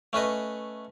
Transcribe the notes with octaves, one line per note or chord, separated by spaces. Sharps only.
A3 C#4 B4 D#5